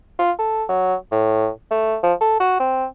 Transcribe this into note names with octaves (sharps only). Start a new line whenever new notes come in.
F4
A4
F#3
A2
A3
F3
A4
F#4
C4